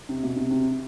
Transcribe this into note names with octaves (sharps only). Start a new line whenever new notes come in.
C3
B2
C3
C3